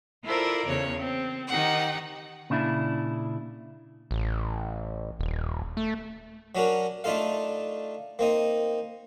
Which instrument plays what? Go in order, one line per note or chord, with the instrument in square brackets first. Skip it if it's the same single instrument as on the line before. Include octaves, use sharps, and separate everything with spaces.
[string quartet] E4 F4 A4 A#4 C5 D5
E2 C#3 C#5
C4
D#3 D#4 G4 F#5
[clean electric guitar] A#2 C#3 D4 E4
[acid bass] A1
D#1
A3
[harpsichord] F#3 C#4 D4 F#4 A#4
A3 D4 D#4 F4 A4 F5
A#3 C4 D#4